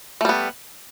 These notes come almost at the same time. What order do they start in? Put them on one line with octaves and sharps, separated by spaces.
A3 G3 B3